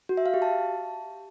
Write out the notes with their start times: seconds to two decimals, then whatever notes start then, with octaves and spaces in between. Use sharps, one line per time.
0.09 F#4
0.17 E5
0.26 F5
0.34 G4
0.42 A5